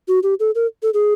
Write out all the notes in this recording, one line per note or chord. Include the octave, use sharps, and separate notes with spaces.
F#4
G4
A4
A#4
A4
G#4